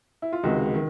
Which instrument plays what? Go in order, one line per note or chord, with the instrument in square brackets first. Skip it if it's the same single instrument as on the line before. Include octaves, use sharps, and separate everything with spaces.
[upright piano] E4
F4
C#2 C3 D#3 G#3 F#4
D#3